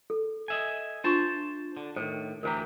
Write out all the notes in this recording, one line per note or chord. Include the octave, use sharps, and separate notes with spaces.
A4
D#5 E5 G#5
D4 F4 C5 A5 C#6
D3
A2 D#3 C5
D2 E3 G4 A#4 C5 A#5